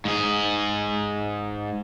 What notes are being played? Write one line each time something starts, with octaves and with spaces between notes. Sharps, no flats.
G#2 G#4